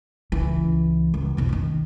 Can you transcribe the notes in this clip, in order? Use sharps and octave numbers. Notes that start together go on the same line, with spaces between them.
C#2 E3
C#2
B1 F2
G2 D#3